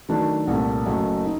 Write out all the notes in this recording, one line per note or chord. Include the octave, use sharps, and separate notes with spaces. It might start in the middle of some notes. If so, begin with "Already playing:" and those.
D#3 F#3 A3 D4 F#4
C2 A#2 A3
F#1 F#2 F#3 A3
D#4